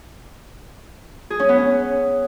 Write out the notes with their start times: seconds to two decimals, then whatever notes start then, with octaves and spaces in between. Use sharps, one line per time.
1.30 G#4
1.40 C#4
1.49 B3
1.58 C#4